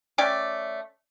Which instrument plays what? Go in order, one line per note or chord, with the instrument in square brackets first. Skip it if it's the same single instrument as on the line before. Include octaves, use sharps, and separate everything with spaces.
[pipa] A3 C#4 D5 G5